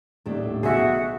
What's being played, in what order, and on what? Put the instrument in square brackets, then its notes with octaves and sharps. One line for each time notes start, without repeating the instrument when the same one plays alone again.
[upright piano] D#1 D#4 D5 [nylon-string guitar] A2 A3 D4
[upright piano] B1 B2 [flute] F#4 [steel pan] G#4 E5